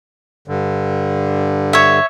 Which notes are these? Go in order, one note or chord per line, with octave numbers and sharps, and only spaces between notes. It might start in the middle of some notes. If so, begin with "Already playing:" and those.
G2 D3
C#5 E5